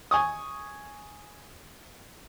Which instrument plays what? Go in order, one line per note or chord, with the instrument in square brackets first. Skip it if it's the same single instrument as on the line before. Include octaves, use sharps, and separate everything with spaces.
[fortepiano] G#5 C#6 D#6